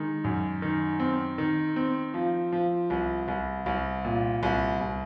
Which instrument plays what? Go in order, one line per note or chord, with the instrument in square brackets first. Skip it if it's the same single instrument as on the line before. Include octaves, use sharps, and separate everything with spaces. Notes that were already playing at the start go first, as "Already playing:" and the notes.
Already playing: [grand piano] D#3 G#3
F#2
D#3
C4
D#3
C4
F3
F3
C2
C2
C2
A#2
C2
C2